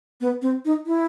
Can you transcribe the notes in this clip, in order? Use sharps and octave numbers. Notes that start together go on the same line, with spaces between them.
B3
C4
D#4
E4